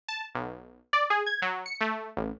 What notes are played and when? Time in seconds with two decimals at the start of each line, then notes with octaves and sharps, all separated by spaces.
0.08 A5
0.35 B1
0.93 D5
1.10 G#4
1.26 G#6
1.42 F#3
1.66 C#7
1.81 A3
2.17 A1